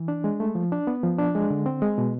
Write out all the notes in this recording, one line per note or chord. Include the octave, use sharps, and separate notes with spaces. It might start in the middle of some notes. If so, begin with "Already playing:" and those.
Already playing: E3
D4
G#3
A3
F3
D4
B3
F3
D4
G#3
D3
C4
G#3
B2